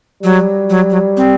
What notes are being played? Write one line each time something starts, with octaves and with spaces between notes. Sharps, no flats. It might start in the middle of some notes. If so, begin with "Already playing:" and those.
F#3 G3
F#3
F#3
C4